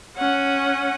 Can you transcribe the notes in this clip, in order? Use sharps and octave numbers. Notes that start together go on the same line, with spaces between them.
C#4 F#5